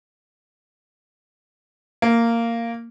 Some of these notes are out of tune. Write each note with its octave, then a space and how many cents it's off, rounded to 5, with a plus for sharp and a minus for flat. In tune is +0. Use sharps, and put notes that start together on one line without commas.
A#3 -10